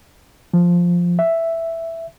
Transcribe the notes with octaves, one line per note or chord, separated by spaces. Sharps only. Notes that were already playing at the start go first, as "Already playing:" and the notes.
F3
E5